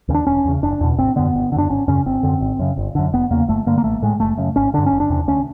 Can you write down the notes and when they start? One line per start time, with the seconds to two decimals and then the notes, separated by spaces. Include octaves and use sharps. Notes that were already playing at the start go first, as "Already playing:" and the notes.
0.09 D#2 C#3
0.14 D4
0.27 E1 C#4
0.45 E2 C#3
0.62 F#1 D4
0.81 E2 B2
0.98 G#1 C4
1.16 F#2 D3 B3
1.34 G1
1.52 D3
1.56 F#2 D4
1.70 G#1 C#4
1.88 F#2 C#3 C#4
2.06 G1 C4
2.23 F#2 D3
2.41 G#1
2.59 F#2 C#3
2.77 G1
2.95 F#2 D3
3.13 F1 B3
3.30 E2 C#3 A#3
3.48 G1 A3
3.67 G2 D3 A#3
3.78 A#3
3.84 A1 A3
4.02 A2 G#3
4.20 F#1 A3
4.38 F#2 C#3
4.56 G#1 C#4
4.74 G2 D3 D4
4.86 C#4
4.92 F#1
5.00 D4
5.10 E2 C3
5.28 D2 C#4